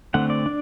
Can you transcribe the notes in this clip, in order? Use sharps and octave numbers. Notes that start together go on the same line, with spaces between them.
D3 A3 C4 F#5
D5
D4